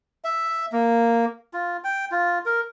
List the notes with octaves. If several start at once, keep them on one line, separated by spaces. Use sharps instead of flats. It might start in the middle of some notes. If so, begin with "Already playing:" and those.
E5
A#3
F4
G5
F4
A#4